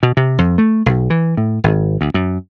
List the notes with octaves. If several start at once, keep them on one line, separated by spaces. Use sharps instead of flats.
B2
C3
F2
A3
B1
E3
A2
G#1
D2
F#2